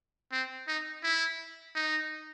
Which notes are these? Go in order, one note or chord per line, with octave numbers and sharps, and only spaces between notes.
C4
D#4
E4
D#4